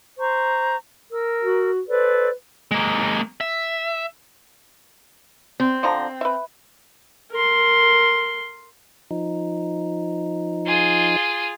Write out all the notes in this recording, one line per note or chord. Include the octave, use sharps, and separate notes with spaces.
C5 A#5 C#6
A#4 E6
F#4
A4 B4 C5 D5
G#3 A#3
E5
C4
D3 F3 A#5
B4 E5
A#4 C6
F3 D#4
F4 G#4